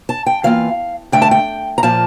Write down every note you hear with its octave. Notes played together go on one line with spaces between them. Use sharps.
A5
G5
E2 E3 A#3 F4 F5
G2 D3 A3 G5
A5
G5
A#5
A#2 F3 A#3 F4 A5